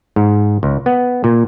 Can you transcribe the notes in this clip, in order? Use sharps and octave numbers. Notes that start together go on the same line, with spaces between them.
G#2
C#2
B3
A#2